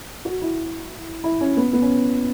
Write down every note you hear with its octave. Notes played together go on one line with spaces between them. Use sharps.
F#4
E4
E4
C#4
B3
B3
C#4